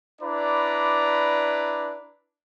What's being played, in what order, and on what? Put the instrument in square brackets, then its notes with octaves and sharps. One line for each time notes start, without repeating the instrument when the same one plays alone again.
[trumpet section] D4 E4 B4 D5 A#5